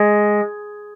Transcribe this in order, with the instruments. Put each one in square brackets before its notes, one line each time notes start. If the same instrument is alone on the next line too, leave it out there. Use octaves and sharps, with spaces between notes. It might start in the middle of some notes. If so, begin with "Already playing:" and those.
Already playing: [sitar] G#3